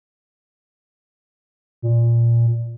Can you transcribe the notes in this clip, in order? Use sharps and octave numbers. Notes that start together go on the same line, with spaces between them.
A#2